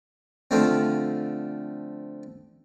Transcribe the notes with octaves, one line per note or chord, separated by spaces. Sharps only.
D3 F3 A3 C4